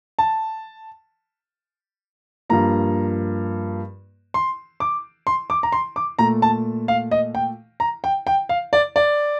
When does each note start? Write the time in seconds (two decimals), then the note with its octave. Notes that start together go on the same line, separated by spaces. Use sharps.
0.19 A5
2.50 G2 F3 A#3 A#5
4.34 C6
4.80 D6
5.27 C6
5.50 D6
5.63 A#5
5.72 C6
5.96 D6
6.19 A#2 A3 A#5
6.42 A5
6.88 F5
7.11 D#5
7.35 G5
7.80 A#5
8.04 G5
8.27 G5
8.49 F5
8.73 D5
8.96 D5